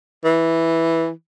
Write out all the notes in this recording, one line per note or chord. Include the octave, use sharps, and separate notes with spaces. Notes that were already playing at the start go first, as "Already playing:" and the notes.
E3